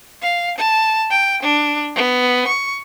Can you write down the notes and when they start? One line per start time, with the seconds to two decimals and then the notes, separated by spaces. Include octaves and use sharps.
0.22 F5
0.58 A5
1.10 G5
1.43 D4
1.95 B3
2.47 C#6